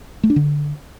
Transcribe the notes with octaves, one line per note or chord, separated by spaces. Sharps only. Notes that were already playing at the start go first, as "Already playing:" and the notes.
A3
D4
D3